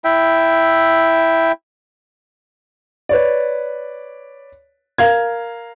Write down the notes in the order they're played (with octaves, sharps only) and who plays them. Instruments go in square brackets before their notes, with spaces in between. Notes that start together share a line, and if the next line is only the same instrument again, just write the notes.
[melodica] E4 E5 G5
[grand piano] B4 C#5 D5
A#4 F5 G#6